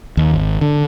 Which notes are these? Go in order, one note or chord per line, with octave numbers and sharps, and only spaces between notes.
D#2
G#1
D3